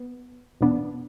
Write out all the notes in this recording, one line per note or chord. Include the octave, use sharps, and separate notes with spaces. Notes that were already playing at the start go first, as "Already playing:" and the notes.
Already playing: B3
E2 B2 B3 D4